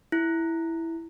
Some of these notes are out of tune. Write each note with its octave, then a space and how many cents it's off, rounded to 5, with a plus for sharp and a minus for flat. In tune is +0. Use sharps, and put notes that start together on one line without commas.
E4 +0